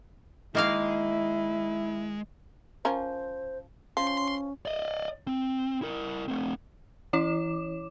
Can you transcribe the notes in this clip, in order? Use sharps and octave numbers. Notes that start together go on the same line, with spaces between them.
D#3 G#3 A#3 E4 F5
F3 C#4 A#4 C5
F3 C#4 C6
D5 D#5
C4
E4 A#4
A3 C4
E3 E4 C#5 D6 E7